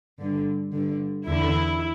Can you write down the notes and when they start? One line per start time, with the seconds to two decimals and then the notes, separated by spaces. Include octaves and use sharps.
0.19 G2 D3
0.72 G2 D3
1.27 E2 D3 E4